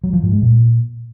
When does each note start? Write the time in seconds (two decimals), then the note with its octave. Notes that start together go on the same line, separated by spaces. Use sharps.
0.04 F#3
0.13 F3
0.23 G#2
0.33 G#3
0.42 A#2